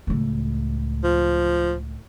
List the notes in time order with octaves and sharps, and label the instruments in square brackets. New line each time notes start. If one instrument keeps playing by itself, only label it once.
[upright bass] C#2 A2
[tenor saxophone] F3